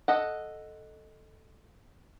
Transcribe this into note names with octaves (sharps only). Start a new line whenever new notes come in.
A4 D#5 F#5